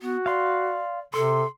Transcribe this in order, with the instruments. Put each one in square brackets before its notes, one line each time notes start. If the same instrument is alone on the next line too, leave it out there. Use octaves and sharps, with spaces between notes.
[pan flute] B3 [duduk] F#4
[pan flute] D5 [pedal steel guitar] F5 C6
[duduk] C3 [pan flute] A4 [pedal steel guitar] C6